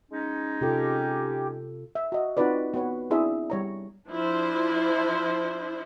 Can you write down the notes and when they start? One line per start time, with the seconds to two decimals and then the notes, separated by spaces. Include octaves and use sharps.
0.11 G#3 C#4 D#4
0.61 C3 F4 G4 A4
1.95 E5
2.12 F#4 D#5
2.37 C4 D#4 F4 F#4 B4 D5
2.74 B3 F#4 B4 C#5
3.10 C4 D4 E4 G#4 D5 E5
3.50 G3 C#5 A#5
4.08 F3 D4 E4 C5